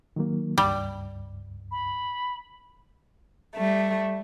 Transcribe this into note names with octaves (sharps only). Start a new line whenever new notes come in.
D#3 F#3 A#3
C#2 G2 G3
B5
G3 A3